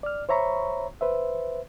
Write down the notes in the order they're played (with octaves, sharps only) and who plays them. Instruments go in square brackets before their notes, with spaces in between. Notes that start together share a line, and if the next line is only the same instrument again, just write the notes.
[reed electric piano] D5 F6
C5 C#5 E5 A#5 B5 C#6
B4 C5 E5